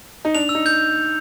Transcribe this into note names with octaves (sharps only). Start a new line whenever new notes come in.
D#4
D4 F7
E6
D#4
G6